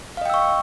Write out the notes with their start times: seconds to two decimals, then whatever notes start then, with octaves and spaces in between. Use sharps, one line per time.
0.17 F5
0.21 D#5
0.26 G5
0.30 E6
0.34 C#6